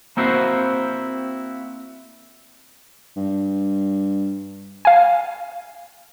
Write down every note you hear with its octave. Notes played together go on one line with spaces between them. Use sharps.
A#3 C4 E4 F#4 C5
G2
F5 G#5